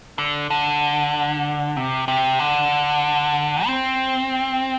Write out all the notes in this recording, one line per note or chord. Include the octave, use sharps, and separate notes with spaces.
D3
D3
C3
C3
D3
C4